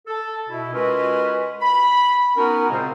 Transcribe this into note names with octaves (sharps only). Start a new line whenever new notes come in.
A4
B2 E4
G#3 C#4 F4 F#4 A#4 B4
B5
B3 C#4 D#4 F#4 A#4
A#2 C#3 G#3 C4